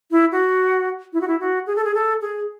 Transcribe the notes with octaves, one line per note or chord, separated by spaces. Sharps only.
E4
F#4
E4
F#4
E4
F#4
G#4
A4
G#4
A4
G#4